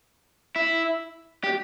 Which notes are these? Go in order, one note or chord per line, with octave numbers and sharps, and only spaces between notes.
E4
G4